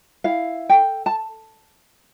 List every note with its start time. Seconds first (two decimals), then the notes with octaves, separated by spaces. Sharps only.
0.24 E4 F5
0.69 A4 G5
1.06 A5